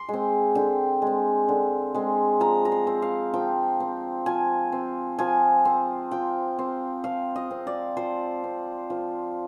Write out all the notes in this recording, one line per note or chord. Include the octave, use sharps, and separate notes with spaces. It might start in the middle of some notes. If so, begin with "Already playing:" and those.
Already playing: C6 D6
G#3 C4
D3 G5
G#3 C4
D3
G#3 C4
F3 A#5
A#5
C6
C4
F5
F3 G5
C4
F3 G#5
C4
F3 G#5
C4
F3 G5
C4
F3 F5
D#5
C4
D5
F3 C5
C4
F3